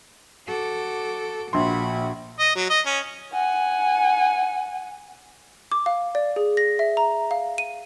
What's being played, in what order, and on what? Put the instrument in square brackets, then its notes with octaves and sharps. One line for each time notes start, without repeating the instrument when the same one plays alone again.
[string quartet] F#4 A4 D6
[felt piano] A#1 C6 [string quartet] A#2 F#4 B5
[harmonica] D#5
F#3
D#5
C#4
[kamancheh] F#5 G#5
[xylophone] D6
F5
D5
G#4
A#6
E5
A#5
F5
D#7